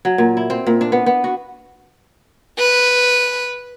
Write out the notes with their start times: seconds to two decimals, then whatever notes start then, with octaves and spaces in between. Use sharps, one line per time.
0.05 F#3
0.18 A#2
0.37 E4
0.50 C4
0.67 A#2
0.81 D4
0.92 B3
1.06 B3
1.24 F#4
2.58 B4